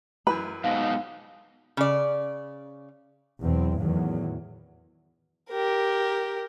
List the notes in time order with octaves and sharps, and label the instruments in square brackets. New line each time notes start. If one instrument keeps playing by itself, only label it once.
[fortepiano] F#2 E3 B4 [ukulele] B5
[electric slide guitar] G#2 B2 [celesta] F5
[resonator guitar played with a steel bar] C#3 D5
[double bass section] E2 B2 F#3 C4
E2 A2 D#3 F#3
[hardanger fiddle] G4 A#4